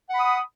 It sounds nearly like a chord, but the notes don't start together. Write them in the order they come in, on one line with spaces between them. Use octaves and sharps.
F#5 B5 D#6